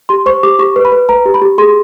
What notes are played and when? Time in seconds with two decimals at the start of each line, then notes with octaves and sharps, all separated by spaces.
0.09 G4 C6
0.26 C5 C#6
0.43 G4 D6
0.59 G4 C#6
0.76 B4
0.85 B5
0.92 B4
1.09 B4 A#5
1.25 G4
1.34 B5
1.41 G4
1.58 G#4 C6